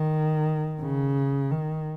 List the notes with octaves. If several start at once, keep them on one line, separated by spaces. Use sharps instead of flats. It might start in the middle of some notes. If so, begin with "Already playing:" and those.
Already playing: D#3
C#3
D#3